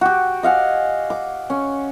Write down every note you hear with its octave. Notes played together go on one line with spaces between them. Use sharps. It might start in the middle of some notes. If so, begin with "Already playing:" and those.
F#4 G4
D#5 F5 F#5 G#5
D6
C#4